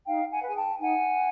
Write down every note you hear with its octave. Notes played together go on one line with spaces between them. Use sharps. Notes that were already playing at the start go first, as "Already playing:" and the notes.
D#4 F5 G5
F#5 G#5
G#4 B4 G#5
G5 A5
D#4 F#5 G#5